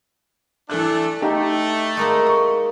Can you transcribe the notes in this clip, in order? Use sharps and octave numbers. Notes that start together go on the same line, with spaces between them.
E3 A3 D4 A4 F#6
A3 D#4 G4 A#5
G#3 A#3 D#4
C#6